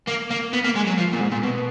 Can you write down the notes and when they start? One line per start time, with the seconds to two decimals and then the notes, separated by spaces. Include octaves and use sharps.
0.08 A#3
0.31 A#3
0.53 B3
0.64 A#3
0.76 G#3
0.87 F#3
0.98 F3
1.13 A#2
1.20 G#2
1.32 A#2
1.43 B2